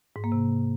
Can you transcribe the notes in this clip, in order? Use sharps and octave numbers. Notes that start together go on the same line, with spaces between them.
G#2
A#3
C3